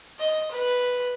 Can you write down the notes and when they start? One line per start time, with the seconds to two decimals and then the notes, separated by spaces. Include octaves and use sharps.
0.19 D#5
0.51 B4